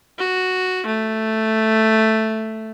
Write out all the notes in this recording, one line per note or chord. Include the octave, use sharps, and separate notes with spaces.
F#4
A3